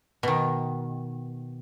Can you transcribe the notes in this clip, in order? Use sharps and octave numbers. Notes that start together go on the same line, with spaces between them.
B2 D#3